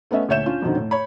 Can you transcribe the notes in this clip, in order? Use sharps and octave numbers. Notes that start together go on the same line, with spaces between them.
A3 B3 C#4 D#5 E5
D2 A#2 C#5 E5 G6 E7
C#4 D4 F4
F2 B2 D3 D#3 C4
A2
C#5 B5